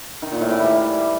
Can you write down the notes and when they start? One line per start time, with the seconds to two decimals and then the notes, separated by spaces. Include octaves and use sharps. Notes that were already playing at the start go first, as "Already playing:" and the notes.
0.22 D#3
0.32 A#2
0.41 A2
0.50 E3
0.60 G3